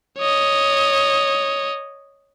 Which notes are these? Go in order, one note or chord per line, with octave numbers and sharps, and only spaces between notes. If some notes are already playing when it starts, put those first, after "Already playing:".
C#5 D#5